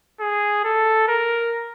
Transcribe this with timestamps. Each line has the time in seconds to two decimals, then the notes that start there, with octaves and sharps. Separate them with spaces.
0.20 G#4
0.64 A4
1.08 A#4